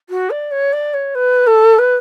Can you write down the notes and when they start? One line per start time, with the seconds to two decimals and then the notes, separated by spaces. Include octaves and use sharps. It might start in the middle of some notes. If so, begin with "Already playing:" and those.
0.09 F#4
0.30 D5
0.51 C#5
0.73 D5
0.94 C#5
1.15 B4
1.47 A4
1.78 B4